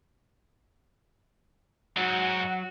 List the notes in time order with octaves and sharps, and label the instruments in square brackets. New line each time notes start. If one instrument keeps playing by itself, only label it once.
[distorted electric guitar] G#2 [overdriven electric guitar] F#3 [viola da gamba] F#4 [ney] F#5